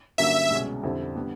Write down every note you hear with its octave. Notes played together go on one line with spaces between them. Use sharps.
G2 D3 F#3 A#3 C#4 E5
C2 B2 G#3 C#4
F2 D3 G3 C4 E4
D3 G3 B3